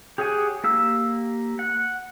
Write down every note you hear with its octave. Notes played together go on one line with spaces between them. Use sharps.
G4 G#4 C#5 F#5 G#5
A#3 G4 E6
F#5